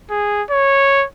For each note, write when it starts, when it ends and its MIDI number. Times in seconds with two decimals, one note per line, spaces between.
0.10 0.42 68
0.51 1.05 73